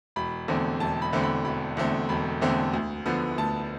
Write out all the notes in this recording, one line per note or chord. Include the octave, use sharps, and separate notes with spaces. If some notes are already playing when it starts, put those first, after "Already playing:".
E1 B5
E2 D3 A3 C4
E1 A5
B5
E2 D3 A3 C4
B5
E1 B5
E2 D3 A3 C4
E1 B5
E2 D3 A3 C4
D2
D3 F3 B3
D2 A5